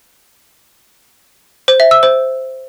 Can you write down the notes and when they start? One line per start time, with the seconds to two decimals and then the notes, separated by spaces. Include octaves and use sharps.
1.68 C5
1.80 E5
1.91 E6
2.03 C5